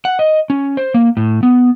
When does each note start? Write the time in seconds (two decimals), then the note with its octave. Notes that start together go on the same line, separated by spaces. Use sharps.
0.05 F#5
0.19 D#5
0.50 C#4
0.77 C5
0.94 A#3
1.17 A2
1.43 B3